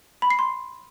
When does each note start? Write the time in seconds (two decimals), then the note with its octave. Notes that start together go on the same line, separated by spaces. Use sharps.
0.22 B5
0.30 C7
0.39 C6